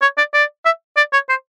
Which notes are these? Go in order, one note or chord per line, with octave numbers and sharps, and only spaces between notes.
C#5
D5
D5
E5
D5
C#5
C5